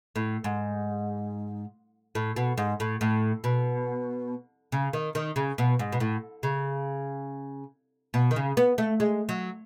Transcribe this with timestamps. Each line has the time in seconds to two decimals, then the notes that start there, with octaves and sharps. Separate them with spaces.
0.16 A2
0.44 G#2
2.15 A2
2.36 B2
2.58 G#2
2.80 A2
3.01 A2
3.44 B2
4.72 C#3
4.93 D#3
5.15 D#3
5.36 C#3
5.58 B2
5.79 G#2
5.92 B2
6.00 A2
6.43 C#3
8.14 B2
8.31 D#3
8.36 C#3
8.57 B3
8.78 A3
9.00 G#3
9.29 F#3